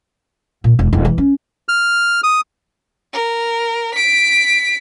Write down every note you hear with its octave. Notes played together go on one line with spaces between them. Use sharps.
A#2
E1
E1
E3
C#4
F6
D#6
A#4
B6 D7